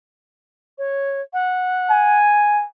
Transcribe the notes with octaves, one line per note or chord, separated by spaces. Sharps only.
C#5
F#5
G#5